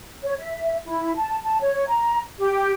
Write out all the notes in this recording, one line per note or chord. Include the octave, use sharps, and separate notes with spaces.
C#5
E5
E4
A5
A5
C#5
A#5
G4